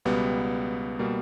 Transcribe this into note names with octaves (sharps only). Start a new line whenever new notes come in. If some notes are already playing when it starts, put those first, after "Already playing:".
C#2 B2 G3 B3
B2 G3 A#3